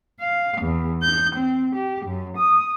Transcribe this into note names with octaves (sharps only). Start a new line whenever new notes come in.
F5
E2
G6
C4
G4
F#2
D#6